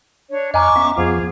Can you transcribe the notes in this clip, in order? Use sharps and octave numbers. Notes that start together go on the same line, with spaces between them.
D4 C#5
F2 D#5 G#5 A#5 C#6 D6 F6 F#6
B3 C#4 E5
F2 F3 B3 F4 G#4